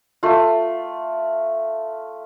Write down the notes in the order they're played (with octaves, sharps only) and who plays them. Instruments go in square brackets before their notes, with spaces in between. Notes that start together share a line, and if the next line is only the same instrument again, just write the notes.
[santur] A3 F4